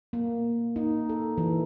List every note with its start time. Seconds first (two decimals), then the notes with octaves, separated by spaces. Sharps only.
0.13 A#3
0.76 D#4
1.09 A4
1.38 E3